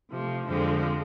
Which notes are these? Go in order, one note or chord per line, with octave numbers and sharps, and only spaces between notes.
C3 F3 A3
F2 D3 F3 G#3 C4